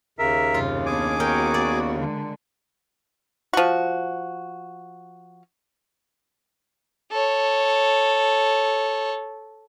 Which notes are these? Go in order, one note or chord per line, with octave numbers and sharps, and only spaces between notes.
D#2 C#3 A#4 E5
F#2 C3 F4
B3 D4 G#4 G#5 D6
B3 F#4 A#4 G5
D5
D3 G#3
F3 F#4
A4 C#5